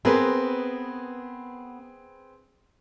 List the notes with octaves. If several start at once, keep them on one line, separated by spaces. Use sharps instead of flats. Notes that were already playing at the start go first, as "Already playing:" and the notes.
B3 C4 G#4 A#4 B4